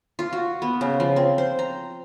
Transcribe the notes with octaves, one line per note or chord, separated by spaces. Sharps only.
F4
F#4
B3
C#3
F3
C4
C5
A#5